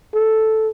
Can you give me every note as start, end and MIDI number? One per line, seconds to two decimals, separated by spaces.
0.14 0.68 69